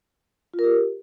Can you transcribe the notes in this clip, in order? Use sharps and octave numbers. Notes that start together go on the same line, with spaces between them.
F4
A#4
G4